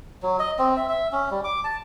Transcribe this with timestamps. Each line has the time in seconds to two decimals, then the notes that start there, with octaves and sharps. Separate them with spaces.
0.23 F#3
0.39 D#5
0.59 C4
0.76 E5
0.89 E5
1.12 C#4
1.31 G3
1.44 D6
1.64 A5